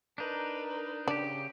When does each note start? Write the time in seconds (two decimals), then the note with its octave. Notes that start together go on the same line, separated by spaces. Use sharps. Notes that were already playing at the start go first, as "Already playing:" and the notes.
0.18 D4 D#4 A#4 B4
1.08 C#3 D4 G4